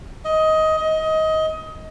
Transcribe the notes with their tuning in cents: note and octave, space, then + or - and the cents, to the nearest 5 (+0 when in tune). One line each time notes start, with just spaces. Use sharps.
D#5 +15
D#5 +20